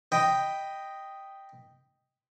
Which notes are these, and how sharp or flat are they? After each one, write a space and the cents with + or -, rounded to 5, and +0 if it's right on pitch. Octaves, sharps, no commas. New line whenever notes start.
D#5 +0 G5 +0 B5 +0